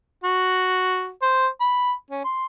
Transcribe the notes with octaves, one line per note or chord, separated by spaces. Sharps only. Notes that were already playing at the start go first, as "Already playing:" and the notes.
F#4
C5
B5
C#4
C6